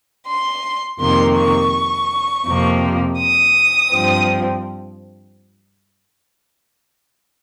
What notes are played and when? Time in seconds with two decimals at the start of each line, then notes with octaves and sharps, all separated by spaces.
0.27 C6
0.99 F2 C3 D#3 A#3 C6
1.36 C#6
2.46 F2 C3 F3 A#3
3.19 D#6
3.92 G2 F3 C4